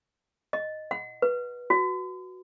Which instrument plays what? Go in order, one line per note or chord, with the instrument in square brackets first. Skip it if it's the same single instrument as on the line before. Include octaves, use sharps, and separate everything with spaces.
[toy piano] D#5
F#5
B4
F#4